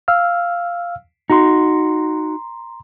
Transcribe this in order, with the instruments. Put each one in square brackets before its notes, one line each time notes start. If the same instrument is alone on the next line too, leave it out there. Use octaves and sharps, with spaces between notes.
[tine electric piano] F5 E6 F6
[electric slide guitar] D#4 F#4 [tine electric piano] A#5 C6